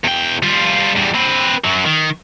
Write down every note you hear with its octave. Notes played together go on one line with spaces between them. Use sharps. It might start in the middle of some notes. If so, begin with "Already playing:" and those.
E2 G5
G3 F4
E2 G3
C4 B4
F#2 F#3
D#3